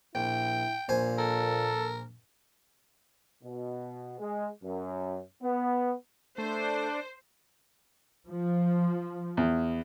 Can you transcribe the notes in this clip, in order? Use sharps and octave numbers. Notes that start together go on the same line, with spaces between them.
A#1 E4 G5
A#1 A#2 C5 G#5
A4 A#4
B2
G#3
F#2
B3
A3 D4 C5
F3
E2